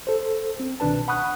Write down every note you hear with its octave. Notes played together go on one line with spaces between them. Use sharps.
A4 C5
C4
C2 B2 D#3 D4 B4 A5
F#5 B5 C#6 D#6 F#6